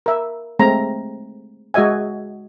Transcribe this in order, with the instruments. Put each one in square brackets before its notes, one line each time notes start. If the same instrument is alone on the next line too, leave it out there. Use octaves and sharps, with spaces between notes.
[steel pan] A#4 E5
G#3 A3 C4 A#5
G#3 F#4 D#5 E5 G#5